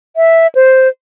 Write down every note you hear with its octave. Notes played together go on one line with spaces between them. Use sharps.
E5
C5